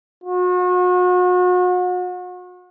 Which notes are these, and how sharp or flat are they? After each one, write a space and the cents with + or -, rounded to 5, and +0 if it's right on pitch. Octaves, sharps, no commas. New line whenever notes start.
F#4 -40